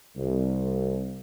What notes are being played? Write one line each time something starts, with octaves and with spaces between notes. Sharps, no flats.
C2